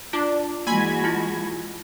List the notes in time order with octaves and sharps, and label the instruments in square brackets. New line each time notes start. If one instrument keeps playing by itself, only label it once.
[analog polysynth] D4 [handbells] F4 D6
[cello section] E3 G#3 F#4 [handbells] A#3 [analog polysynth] G#5 B5 G#6
[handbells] E4 F4 A5